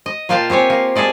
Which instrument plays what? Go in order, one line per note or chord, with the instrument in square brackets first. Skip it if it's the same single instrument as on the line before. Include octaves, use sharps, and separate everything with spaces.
[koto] D#5
A#2 A#3 F4 F5 G5 A5
C4 G4 C#5 G#5
A#3
G#4 A4 D5 D#5